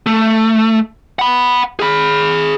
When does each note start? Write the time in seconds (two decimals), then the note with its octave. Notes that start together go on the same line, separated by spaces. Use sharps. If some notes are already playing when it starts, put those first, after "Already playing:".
0.06 A3
1.19 F#5 B5
1.80 G#4 B5